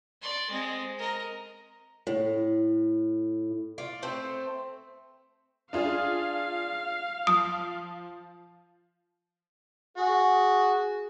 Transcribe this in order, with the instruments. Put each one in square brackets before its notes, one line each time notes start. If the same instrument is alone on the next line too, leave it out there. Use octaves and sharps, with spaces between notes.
[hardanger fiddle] D5 C6
G#3 C4
A#4 D#5
[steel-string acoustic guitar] A2
[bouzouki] F4 D5
A3 C4 C5
[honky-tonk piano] D4 F4 G#4 [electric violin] F5
[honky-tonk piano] F3 [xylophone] D#6
[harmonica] F#4 [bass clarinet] G#4